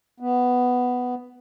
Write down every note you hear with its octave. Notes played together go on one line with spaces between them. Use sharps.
B3